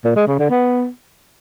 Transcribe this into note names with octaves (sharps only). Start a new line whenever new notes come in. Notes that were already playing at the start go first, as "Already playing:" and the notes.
A#2
G#3
C#3
D3
B3